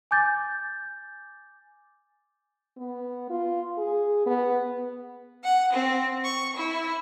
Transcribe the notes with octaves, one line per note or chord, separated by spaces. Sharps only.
G#5 D6 G6 A6
B3
F4
G#4
B3
F#5
C4
C#6
E4